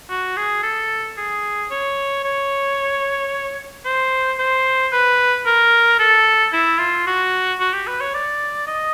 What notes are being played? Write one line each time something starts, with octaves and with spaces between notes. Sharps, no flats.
F#4
G#4
A4
G#4
C#5
C#5
C5
C5
B4
A#4
A4
E4
F4
F#4
F#4
G4
B4
C#5
D5
D#5